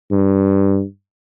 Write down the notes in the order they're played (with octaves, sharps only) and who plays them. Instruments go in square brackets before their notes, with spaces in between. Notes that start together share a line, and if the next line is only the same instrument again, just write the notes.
[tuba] G2